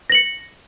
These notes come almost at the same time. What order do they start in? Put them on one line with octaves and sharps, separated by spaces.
A#6 F#7 C#7